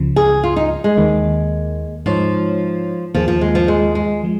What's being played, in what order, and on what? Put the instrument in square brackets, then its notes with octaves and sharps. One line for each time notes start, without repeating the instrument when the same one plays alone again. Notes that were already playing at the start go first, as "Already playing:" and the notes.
Already playing: [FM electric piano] C#2 C#3 F3
[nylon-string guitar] G#4
F4
D#4
G#3
[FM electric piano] D#2 D#3 A#3
[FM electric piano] G#2 G#3 D#4 C#5 [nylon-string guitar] F3
[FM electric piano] D#2 D#3 A#3 F4 G#4 [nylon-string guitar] F3
[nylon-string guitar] F3
G#3
F3
G#3
G#3
[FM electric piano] F3 G#3